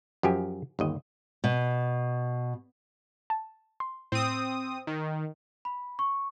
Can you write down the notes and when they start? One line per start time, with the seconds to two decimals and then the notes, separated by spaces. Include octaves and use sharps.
0.23 F#2 F3 G4 G#5
0.79 G1 D#2 D#5
1.44 B2
3.30 A5
3.80 C6
4.12 A2 C4 D#6
4.87 D#3
5.65 B5
5.99 C#6